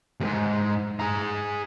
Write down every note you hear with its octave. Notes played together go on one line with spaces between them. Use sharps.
D#2 G#2
G#4 A#5